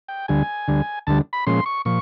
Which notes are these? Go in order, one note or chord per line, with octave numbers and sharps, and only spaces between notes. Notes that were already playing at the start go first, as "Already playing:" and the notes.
G5
D2 D3 G3 G#5
D2 D3 G3
D2 D3 G3 A5
B5
A#2 F3 G#3 C#4 C6
C#6
A#2 F3 C#6